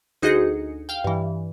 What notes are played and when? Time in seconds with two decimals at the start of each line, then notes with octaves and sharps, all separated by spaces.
0.22 D2 D#4 F#4 G#4 D#5 C#7
0.89 F5 G5
1.04 G2 E3